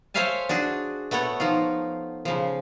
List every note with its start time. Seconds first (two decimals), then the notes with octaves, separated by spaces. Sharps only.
0.14 C5 C#5 E5 F5 G#5 A5
0.49 D4 F#4 G#4
1.11 A3 B3 A4 C#5 F#5
1.40 F3 D#4 F4
2.25 C#3 F3